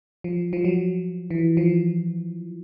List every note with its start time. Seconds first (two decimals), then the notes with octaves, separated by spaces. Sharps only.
0.24 F3
0.53 F3
0.65 F#3
1.30 E3
1.57 F3